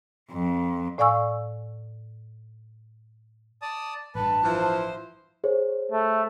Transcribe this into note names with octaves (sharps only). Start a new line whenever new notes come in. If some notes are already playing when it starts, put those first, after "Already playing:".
F2
A2 D5 F5 G#5 C#6 E6
D5 A5 D#6
A1 G2 B4 A5
E3 F3 C5
G#4 C5 C#5
A3